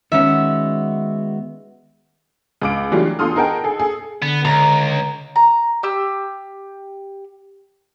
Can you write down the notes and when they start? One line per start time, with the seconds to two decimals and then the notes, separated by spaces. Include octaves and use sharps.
0.12 D#3 G#3 B3 C#4 F#4 E5
2.61 C#2 D6 D7
2.92 E3 F#3 G3 A3 D4 F4
3.19 E2 F4 A4 C6 D#6 F6
3.36 D#4 G#4 A#4 F#5 G5 A5
3.64 G#4 A4
3.80 G#4 A4
4.22 D3 B3
4.45 C#2 A#5
5.36 A#5
5.83 G4 E6